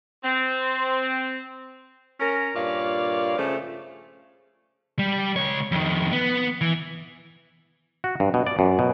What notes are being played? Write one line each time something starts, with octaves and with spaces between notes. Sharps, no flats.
C4
C#4 A#4
G2 A#2 C#5 D5 F5
C#3 F3 A3
G3
C#2 C#5
F2 D#3
B3
E3
F#4
G2
B2
D5
F#2
B2